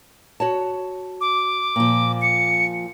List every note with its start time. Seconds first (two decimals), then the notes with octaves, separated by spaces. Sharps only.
0.40 F#4 C#5 A5
1.21 D6
1.76 A#2 F3
2.22 C#7